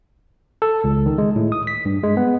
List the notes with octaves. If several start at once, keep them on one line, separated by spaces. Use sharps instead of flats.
A4
C#2
D#3
G#3
A2
D#6
B6
G2
G#3
B3